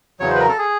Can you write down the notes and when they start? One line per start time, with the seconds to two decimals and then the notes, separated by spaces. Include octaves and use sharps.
0.20 E2 C#3 F#3 C#5
0.30 C5
0.35 B4
0.39 A#4
0.49 A4
0.58 G#4